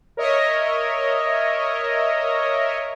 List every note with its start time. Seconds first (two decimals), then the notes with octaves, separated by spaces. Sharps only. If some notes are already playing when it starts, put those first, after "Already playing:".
0.17 A#4 C#5 D#5 E5